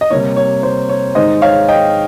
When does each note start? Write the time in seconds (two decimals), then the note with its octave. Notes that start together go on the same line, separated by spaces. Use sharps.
0.01 D#5
0.10 C3 G3 A#3 C#5
0.36 C#5
0.63 C5
0.89 C#5
1.15 G#2 D#3 G#3 C5 D#5
1.42 C#5 F5
1.68 D#5 G5